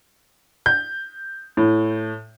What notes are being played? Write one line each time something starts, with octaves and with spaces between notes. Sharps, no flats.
G6
A2